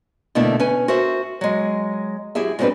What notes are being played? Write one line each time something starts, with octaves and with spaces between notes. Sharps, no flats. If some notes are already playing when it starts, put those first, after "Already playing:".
B2 D3 A3 A#3 E4
C#4 B4 G#5
F#4 A#4 C5 E5
F#3 G#3
F#2 E4 G4 G#4 E5
G#2 F#3 G3 C4 D4 B4